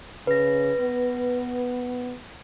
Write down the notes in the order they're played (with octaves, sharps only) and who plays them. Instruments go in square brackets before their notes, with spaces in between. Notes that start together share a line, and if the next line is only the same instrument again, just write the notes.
[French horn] C#3 [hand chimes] B4 A#6
[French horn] B3